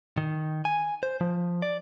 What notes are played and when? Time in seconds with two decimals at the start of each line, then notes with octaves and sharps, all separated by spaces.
0.18 D#3
0.65 G#5
1.03 C5
1.21 F3
1.62 D5